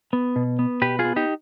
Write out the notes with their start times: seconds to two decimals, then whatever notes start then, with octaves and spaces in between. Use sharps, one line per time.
0.13 B3
0.36 B2
0.59 B3
0.82 B2 G4 B4
0.99 F4 G#4
1.05 B3
1.16 D#4 G4